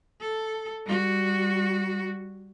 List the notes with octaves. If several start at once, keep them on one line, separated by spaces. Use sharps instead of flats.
A4
G3 F#4